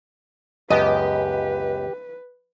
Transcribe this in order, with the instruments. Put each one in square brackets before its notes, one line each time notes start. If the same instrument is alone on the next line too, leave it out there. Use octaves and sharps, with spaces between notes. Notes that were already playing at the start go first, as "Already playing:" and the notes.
[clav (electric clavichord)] C#2 F#2 B3 [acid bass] G4 [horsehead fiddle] B4 [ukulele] D#5